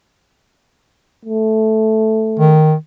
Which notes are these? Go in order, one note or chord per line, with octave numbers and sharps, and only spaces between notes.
A3
D#3